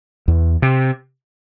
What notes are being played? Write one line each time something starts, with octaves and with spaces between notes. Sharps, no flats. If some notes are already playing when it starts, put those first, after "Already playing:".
E2
C3